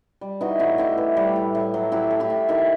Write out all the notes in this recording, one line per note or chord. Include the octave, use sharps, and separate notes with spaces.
G3
E3 D#4 F#4
A2 D#4 F#4
A2 E4 G4
E3
G3
A2
A2
F#3
F#3 E4 G4
A3
E4 G4
A2
D#3 E4 G4